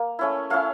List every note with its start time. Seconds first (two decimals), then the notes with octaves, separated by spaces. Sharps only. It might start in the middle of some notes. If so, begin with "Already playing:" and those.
Already playing: A#3
0.19 A3 C#4 E4
0.50 A3 C#4 E4 F5